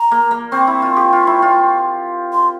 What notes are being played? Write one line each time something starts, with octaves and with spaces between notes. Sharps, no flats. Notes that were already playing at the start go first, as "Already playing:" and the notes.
Already playing: A#5
A#3
A#3
C4 C#6
E4
F4
G4
F4
E4
F4
C6